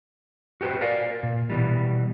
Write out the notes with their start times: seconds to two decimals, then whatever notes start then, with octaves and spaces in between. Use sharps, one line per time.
0.61 F#4 G4 A4 B4 C5
0.81 A#4 D5 F5
1.23 A#2
1.50 B2 E3 G3